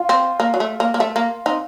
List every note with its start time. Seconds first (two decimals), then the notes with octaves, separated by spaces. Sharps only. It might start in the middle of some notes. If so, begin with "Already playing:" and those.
Already playing: F4
0.09 C4
0.40 A#3
0.54 F#3
0.60 A3
0.80 A#3
0.94 A#3
1.00 A3
1.16 A#3
1.46 C4 D#4